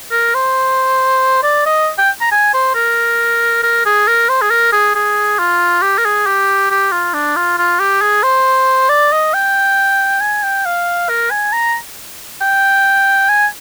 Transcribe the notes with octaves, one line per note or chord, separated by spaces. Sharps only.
A#4
C5
D5
D#5
G5
A#5
G#5
C5
A#4
A#4
G#4
A#4
C5
G#4
A#4
G#4
G#4
F4
G4
A#4
G#4
G4
G4
F4
D4
F4
F4
G4
G#4
C5
D5
D#5
G5
G#5
G5
F5
A#4
G#5
A#5
G5
G#5